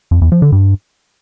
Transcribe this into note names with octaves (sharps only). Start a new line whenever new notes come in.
F2
E2
F3
D3
G2